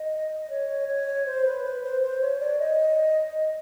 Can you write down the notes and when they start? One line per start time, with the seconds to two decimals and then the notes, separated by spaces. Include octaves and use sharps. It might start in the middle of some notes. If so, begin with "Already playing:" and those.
Already playing: D#5
0.50 C#5
0.88 C#5
1.26 C5
1.45 B4
1.64 B4
1.83 C5
2.02 C5
2.21 C#5
2.40 D5
2.59 D#5